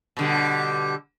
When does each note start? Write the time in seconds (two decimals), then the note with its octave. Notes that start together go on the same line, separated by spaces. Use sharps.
0.17 B2 D3 G3